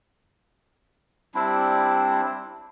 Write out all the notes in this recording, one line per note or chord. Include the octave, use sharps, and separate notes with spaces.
G3 C4 D4 E4